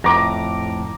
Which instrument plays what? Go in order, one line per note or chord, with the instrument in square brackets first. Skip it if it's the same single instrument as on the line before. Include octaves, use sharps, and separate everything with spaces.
[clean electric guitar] F2 A2 [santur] A#5 D6